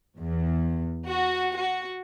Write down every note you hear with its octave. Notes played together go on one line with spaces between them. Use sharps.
E2
F#4
F#4